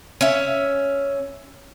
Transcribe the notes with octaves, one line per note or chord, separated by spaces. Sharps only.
C#4 E5